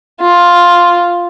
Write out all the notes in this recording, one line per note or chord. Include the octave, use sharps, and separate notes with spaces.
F4